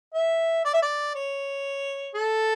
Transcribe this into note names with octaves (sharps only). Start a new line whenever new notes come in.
E5
D5
E5
D5
C#5
A4